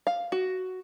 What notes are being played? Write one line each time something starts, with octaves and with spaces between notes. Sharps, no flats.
F5
F#4